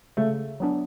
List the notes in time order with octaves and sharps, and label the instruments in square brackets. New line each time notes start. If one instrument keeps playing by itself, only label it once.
[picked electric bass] C#3 [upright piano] A3
[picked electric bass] F#3 B3 D4